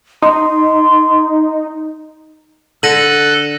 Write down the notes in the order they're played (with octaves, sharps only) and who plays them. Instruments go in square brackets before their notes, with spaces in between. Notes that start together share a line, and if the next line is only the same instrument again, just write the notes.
[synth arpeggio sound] D#4 [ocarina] C6
[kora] D3 [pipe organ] A4 F#6 [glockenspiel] A#6 D#7 F#7